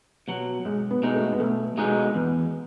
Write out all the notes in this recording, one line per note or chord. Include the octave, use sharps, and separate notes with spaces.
B2 F#3
B1 G#3
B3
B2 G#3 D#4
A3
B3
B1 A3
B2 G#3 D#4
E2 B3